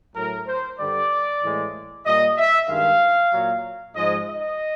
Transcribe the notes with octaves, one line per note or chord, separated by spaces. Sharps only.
A2 F#3 A#4
C5
G2 D3 G3 D5
A2 E3 G#3
A#2 G3 D#5
E5
G2 D#3 G#3 F5
A#2 F#3
G#2 F3 G#3 D#5
D#5